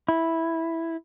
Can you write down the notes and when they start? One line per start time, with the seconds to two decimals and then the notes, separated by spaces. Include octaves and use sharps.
0.08 E4